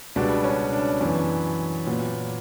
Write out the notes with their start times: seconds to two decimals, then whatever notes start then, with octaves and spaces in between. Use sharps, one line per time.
0.16 C#2 B2 G3 B3 D4
0.44 C#4
0.73 D4
1.01 F#2 E3 B3
1.86 A#2 F#3 B3